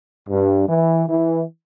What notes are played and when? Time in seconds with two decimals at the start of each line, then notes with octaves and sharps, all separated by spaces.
0.29 G2
0.69 E3
1.08 E3